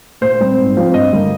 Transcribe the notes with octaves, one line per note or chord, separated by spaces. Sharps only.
A#2 C5
G3 C4
G#2
F3 C4
G2 D#5
D3 G3 A#3